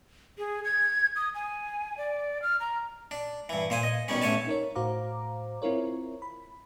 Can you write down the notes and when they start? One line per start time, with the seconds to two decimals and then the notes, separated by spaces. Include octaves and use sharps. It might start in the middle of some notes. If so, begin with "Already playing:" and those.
0.38 G#4
0.64 G#6
1.16 D#6
1.35 G#5
1.97 D5
2.42 F6
2.60 A#5
3.11 D4
3.49 G2 E3
3.70 A#2 C5 G#5
3.83 D#5
4.08 B2 D#3 G3 C#4
4.22 A1 A3 C#5 G#5 A5
4.47 D#4 A#4 C#5
4.75 A2 F#4 C5 F5 A#5 D6
5.62 C4 E4 F4 A#4 C#5
6.22 B5